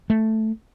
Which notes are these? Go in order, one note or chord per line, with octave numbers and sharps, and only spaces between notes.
A3